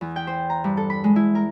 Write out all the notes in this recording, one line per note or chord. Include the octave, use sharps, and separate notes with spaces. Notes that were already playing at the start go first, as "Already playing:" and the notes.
E2
G5
C5
A#5
G2
A4
B5
G#3
E4
A#4